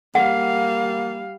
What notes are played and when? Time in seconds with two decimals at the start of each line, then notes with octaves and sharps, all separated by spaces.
0.15 G3 A#3 F5 F#5